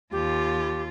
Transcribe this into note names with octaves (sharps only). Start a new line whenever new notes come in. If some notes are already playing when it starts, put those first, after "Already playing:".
D#2 F4 G4